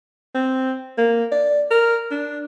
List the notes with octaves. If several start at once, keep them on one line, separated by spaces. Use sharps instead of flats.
C4
A#3
D5
A#4
D4